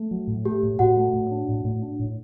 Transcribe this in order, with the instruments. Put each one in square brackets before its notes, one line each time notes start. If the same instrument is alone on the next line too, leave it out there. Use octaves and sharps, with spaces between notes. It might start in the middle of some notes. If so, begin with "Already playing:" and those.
Already playing: [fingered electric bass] A3
F#3
A2
[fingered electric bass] A3 [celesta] G4
[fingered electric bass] A2
[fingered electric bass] A2 [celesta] F#4 F#5
[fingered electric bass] A3
A2
D4
A2
A2
D4
A2